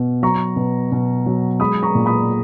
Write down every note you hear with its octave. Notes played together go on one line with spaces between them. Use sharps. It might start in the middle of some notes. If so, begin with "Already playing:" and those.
Already playing: B2
F#3 A#5 C#6
B2
B2
F#3
G#3 B5 D#6
A#5 C#6
A#2
B5 D#6